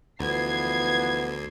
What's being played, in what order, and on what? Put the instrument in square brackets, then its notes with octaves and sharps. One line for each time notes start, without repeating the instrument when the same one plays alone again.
[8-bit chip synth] D2 [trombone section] E3 F3 B3 [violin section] G#6 C7